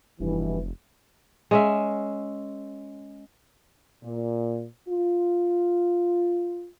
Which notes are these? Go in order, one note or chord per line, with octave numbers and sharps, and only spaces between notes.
F1 G2 B2 E3
G#3 C#4 E5
A#2
F4